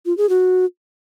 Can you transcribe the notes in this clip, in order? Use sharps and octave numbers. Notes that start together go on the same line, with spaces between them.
F4
G#4
F#4